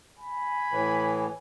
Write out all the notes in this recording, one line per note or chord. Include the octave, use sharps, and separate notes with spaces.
G#5 B5
A2 E3